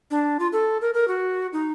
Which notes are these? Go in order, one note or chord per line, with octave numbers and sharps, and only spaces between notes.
D4
F4
A4
A#4
A#4
F#4
D#4